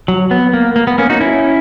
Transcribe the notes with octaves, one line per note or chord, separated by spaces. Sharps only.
F#3
B3
A#3
A#3
B3
A#3 C#4
D#4 F#4
C#4 E4